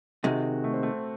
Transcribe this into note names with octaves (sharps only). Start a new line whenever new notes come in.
C3 D#3 G#3 F#4
A3
C4
A3